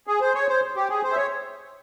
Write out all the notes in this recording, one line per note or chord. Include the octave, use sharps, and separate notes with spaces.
G#4
C5
C#5
C5
G4
G#4
C5
E5
C#5